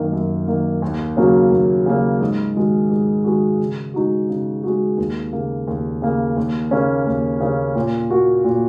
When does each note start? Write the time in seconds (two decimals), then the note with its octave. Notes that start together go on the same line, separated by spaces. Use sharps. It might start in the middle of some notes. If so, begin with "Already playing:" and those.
Already playing: F#2 D#3 A#3
0.13 F#2
0.48 D#3 A#3
0.82 D#2
1.17 C#3 F#3 A#3 C#4
1.51 D#2
1.86 C#3 F#3 A#3 C#4
2.20 G#2
2.56 D#3 G#3 F#4
2.90 G#2
3.24 D#3 G#3 F#4
3.59 C#3
3.94 G#3 D#4 F#4
4.29 C#3
4.63 G#3 D#4 F#4
4.98 D#2
5.33 C#3 A#3
5.67 D#2
6.02 C#3 A#3
6.37 D#2
6.71 C#3 A#3 C#4
7.06 D#2
7.41 C#3 A#3 C#4
7.75 A#2
8.10 A#3 F#4
8.44 A#2